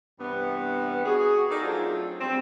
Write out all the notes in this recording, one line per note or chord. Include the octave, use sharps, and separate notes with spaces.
G2 C3 E3 G3 B3
F#4 G#4
D#4 A4 A#4 D5
F#3 A3 C4 D4 F4 G#4
G3 C4